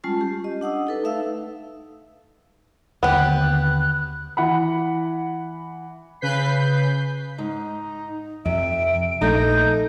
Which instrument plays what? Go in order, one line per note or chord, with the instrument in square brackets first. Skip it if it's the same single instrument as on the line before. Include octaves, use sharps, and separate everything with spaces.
[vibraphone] G3 G#3 C#4 F4 A5
G4
D#5
D4 F#5 D#6 E6
D#4 A4 B4
A3 D#4 E5 F5 E6
[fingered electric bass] D#2 D3 [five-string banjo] B3 G4 [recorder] F#6
[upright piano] E3 F#5 B5
[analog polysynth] C#3 B4 G6 B6 C7
[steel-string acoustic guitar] G#2 [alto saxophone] D#4
[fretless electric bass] F2 [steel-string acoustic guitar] C3 [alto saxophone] E5 [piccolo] D7
[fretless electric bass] A#1 [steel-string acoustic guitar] A3 [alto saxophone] D#4 [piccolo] G6